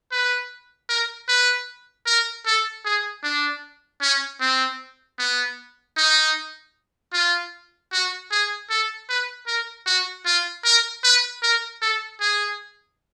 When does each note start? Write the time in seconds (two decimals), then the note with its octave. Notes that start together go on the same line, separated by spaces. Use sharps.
0.12 B4
0.89 A#4
1.29 B4
2.07 A#4
2.46 A4
2.85 G#4
3.24 D4
4.02 C#4
4.41 C4
5.19 B3
5.98 D#4
7.14 F4
7.92 F#4
8.31 G#4
8.70 A4
9.09 B4
9.47 A#4
9.87 F#4
10.26 F4
10.65 A#4
11.04 B4
11.43 A#4
11.82 A4
12.21 G#4